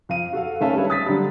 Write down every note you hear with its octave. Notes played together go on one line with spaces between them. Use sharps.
F2 F5 D#7
F#4 A4 F5
G#1 A3 C#4 E5 F5 A5
G3 G#3 D4 B4 C#5
D#6 A6 B6
D3 F#3 G3